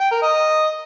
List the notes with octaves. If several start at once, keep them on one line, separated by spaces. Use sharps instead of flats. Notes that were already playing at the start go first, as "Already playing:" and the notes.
G5
A#4
D#5